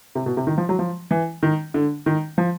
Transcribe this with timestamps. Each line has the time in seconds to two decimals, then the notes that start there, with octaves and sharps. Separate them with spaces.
0.15 C3
0.26 B2
0.37 C3
0.47 D#3
0.58 F3
0.69 F#3
0.79 F3
1.11 E3
1.43 D#3
1.74 D3
2.06 D#3
2.38 F3